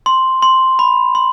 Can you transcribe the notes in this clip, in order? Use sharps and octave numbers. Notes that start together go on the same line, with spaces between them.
C6
C6
B5
C6